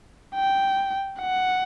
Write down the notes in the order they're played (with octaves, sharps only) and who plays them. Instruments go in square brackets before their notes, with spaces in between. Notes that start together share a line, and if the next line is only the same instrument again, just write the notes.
[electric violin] G5
F#5